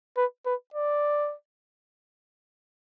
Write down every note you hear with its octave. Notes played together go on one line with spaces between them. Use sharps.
B4
B4
D5